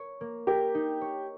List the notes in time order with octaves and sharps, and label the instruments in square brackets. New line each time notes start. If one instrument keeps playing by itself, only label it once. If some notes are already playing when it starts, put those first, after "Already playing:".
Already playing: [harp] A#4 C#5
A#3
[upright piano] G4 [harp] A#4
[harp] D#4
C#5